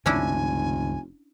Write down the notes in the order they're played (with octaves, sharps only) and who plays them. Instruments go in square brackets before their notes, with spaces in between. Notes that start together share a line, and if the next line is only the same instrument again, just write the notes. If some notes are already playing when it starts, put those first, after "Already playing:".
[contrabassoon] F1 [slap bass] C#2 G2 D#3 [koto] C#4 D4 E4 [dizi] G#5